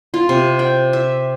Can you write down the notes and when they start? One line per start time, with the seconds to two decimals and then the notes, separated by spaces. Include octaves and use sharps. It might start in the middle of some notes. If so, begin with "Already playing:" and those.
0.14 F4
0.29 C3
0.59 G5
0.93 E5